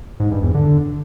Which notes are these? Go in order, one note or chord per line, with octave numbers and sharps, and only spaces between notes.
G#2
G2
E2
D3